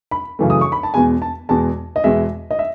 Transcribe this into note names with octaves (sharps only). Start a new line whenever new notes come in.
B5
F#2 C#3 E3 A3
D#6
C#6
B5
A5
E2 B2 G#3 G#5
A5
E2 B2 G#3 A5
D#5
E2 B2 G#3 E5
D#5
E5